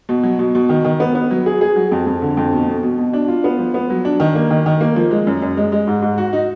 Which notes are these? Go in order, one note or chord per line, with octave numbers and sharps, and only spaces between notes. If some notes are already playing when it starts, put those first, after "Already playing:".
B2
F#3
B2
B2
D#3
D#3
B3
B3
F#3
G#4
G#4
F#3
F2
F2
D3
F2
B2
B2
B2
B2
D4
F4
B3
F3
B3
F#3
D4
D#3
A#3
D#3
D#3
A#3
F3
G#3
F#2
F#2
G#3
G#3
G#2
G#2
F#4
D#4